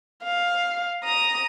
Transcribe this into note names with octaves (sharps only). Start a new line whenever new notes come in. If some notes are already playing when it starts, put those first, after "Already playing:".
F5
A#5 D#6